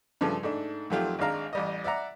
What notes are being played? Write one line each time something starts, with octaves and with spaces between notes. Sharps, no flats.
G2 C#3 F3 A3
G#2 A3 D4
F2 D#3 F#3 A3 F4 G4
G#1 G#3 D4 F5 A#5
A1 G3 D#5
D5 E5 F#5 A#5